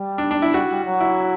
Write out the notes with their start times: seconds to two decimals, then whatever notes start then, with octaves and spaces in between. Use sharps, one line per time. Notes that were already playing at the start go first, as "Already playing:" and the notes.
Already playing: G3
0.18 D4
0.31 D4
0.42 E4
0.54 G3 F#4
0.69 G3
0.85 F#3
1.00 E4